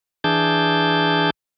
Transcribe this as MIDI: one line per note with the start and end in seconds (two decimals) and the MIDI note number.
0.24 1.30 52
0.24 1.30 62
0.24 1.30 68
0.24 1.30 81
0.24 1.30 91